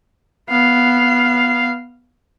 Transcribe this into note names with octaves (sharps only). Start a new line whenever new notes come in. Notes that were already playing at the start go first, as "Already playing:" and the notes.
B3 F5